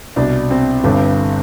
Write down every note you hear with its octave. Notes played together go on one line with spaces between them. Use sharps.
C2 B2 D4
C4
G1 G2 D3